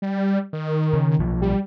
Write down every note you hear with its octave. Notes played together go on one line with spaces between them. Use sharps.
G3
D#3
C#3
B1 F3
G3